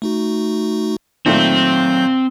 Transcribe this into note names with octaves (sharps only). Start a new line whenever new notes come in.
A3 D#4 F#4
A#2 D#3 F#3 A3 C4 G6